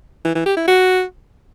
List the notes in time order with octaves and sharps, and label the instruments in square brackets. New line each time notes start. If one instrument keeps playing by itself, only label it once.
[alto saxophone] E3
E3
G4
E4
F#4